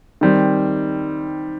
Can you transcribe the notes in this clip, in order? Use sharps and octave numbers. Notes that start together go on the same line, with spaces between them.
D#3 G3 C4